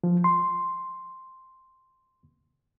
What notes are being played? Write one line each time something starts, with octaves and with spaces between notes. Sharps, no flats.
F3
C6